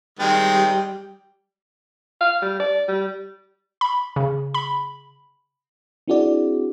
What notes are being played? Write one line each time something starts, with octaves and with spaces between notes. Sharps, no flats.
D#3 G3 G#3 C4 G5
F5
G3
D5
G3
B5
C#3
B5
C4 D4 E4 F#4 G#4 D5